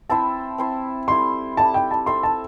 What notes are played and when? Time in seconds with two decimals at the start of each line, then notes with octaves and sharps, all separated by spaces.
0.10 C4 E4 C5 E5 A5
0.58 C4 E4 C5 E5
1.08 G3 E4 A4 C6
1.57 G3 E4 A4 A5
1.74 G5
1.91 A5
2.06 C4 A4 E5 C6
2.23 A5